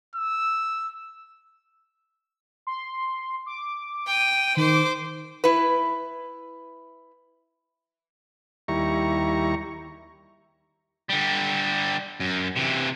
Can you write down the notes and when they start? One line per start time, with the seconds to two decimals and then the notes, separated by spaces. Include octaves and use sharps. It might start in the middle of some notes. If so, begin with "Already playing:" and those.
0.15 E6
2.67 C6
3.46 D6
4.06 G5 D#7
4.57 D#3 C5 D6
5.44 E4 B4
8.68 D#2 G3 E4 A#5 C#6
11.09 D3 G3
12.20 F#2
12.57 C3 E3